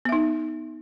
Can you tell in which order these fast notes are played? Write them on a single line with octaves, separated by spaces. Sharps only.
B3 E5 D#4